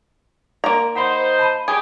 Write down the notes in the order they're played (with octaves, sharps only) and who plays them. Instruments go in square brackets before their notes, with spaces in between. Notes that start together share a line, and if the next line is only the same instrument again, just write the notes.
[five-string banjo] A#3 A#5 [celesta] D5 C6 D7
[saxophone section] D#4 C5 [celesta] F#5 B5 C6
[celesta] A5 B5 D#7
[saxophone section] G4 [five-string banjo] G#4